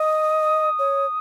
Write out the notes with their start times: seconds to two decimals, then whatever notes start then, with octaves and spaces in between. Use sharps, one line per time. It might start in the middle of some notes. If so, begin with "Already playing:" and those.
Already playing: D#5 D#6
0.79 C#5